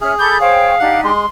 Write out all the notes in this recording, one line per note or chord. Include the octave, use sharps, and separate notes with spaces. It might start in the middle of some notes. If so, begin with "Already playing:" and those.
C#4 G#4 E5 F6
A4 B5 D6 G6
C5 C#5 F5 G5
D4 D#4 G4 F#5
G#3 C6